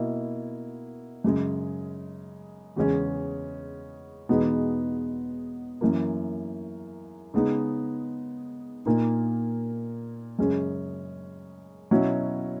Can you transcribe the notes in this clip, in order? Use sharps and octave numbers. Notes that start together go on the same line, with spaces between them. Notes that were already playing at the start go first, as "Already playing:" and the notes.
Already playing: B2 A#3 E4
F#2 C#3 G#3
E2 C#3 G#3 C#4
E2 B2 G#3 B3 D#4
F#2 E3 A#3
C#3 G#3 B3 D#4
A#2 A#3 D#4
F#2 C#3 G#3 C#4
B2 F#3 C#4 E4